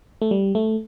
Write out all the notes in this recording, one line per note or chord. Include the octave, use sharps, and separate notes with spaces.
A3
G3
A3